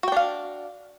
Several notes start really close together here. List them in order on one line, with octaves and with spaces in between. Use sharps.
F#4 G5 D4 F5